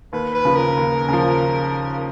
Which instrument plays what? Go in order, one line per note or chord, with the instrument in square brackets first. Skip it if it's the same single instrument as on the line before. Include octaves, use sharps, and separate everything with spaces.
[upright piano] D#2 [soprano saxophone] B4
[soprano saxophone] B4
[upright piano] C#3 F3
[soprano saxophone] A#4
[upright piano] D#2
C#3 F3